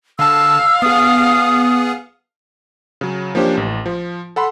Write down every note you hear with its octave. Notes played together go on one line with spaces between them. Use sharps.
D3 F5 A5 E6
B3 G#4 D#6
C#3 F#3
F3 A#3 C#4 D4 G4 C5
A1
F3
A4 F#5 B5 C6